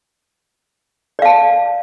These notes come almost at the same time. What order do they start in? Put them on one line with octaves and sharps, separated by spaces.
D5 F5 A5